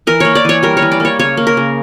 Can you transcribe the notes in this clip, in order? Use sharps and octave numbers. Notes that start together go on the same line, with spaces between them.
E3 A#4
A#3 C#5
D5
E3 C#5
G3 A#4
C#5
E3
D5
A#3 C#5
C#3 C#5
A#3
A#4
C#3